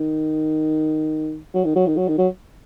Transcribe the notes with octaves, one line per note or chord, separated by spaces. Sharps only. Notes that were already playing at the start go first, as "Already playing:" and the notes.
Already playing: D#3
F#3
D#3
F#3
D#3
F#3
D#3
F#3